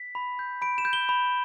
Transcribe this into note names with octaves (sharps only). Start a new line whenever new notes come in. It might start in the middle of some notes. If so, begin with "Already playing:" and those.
Already playing: B6
B5
G6
B5 D7
E7
G6
G7
B5